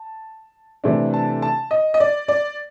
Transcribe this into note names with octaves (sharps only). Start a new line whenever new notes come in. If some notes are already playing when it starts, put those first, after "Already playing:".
Already playing: A5
C3 E3 A3 D4
A5
A5
D#5
D#5
D5
D5